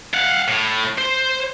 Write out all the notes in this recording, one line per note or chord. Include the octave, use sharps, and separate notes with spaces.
F5 F#5
A2
C5